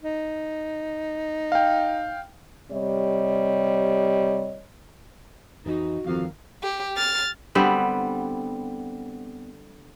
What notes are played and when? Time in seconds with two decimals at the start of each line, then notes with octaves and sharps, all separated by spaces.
0.03 D#4
1.52 F5 G5
2.71 C3 G3 C#5 D#5
5.65 F2 E3 D#4 F#4
6.06 G1 F2 D#3 F5
6.63 G4
6.97 F6 A6
7.55 D3 G3 B3 C4